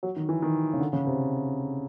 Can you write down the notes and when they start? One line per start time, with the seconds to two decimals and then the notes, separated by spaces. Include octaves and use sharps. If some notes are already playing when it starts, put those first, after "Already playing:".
0.03 F#3
0.16 D#3
0.29 E3
0.42 D#3
0.73 C#3
0.80 D3
0.93 C#3
1.07 C3